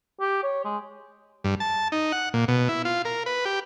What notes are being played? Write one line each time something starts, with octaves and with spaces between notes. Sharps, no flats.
G4
C#5
G#3
G2
A5
D#4
F#5
A#2
B2
E4
F4
A#4
B4
G4